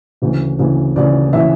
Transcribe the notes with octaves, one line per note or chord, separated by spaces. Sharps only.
D2 C#3 E3
D2 C#3 E3
D2 C#3 E3 D5
C#3 E3 E5